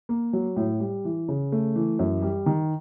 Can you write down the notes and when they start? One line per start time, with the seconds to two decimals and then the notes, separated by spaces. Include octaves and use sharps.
0.09 A#3
0.33 F#3
0.56 A2
0.80 G3
1.05 E3
1.28 C#3
1.52 A3
1.76 E3
1.99 F#2
2.22 G3
2.46 D#3